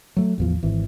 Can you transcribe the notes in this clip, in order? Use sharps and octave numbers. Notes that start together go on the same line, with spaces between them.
F#3 A3
A1 E2 F3
G#1 E3